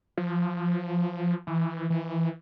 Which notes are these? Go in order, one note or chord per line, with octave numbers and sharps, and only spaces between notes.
F3
E3
E3